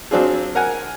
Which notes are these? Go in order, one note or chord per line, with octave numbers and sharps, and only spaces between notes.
F#3 C4 D4 F4 G#4
A#4 F#5 G#5